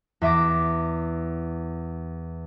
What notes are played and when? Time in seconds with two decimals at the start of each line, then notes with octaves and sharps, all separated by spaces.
0.21 E2 E5 D6 A#6